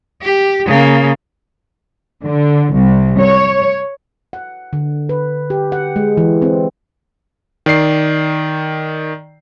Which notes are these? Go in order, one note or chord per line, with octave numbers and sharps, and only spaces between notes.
G4
C#3 A#3
D3
C2
C#5
F#5
D3
B4
G4
F#5
G#3
E3
C4
D#3 D5 C7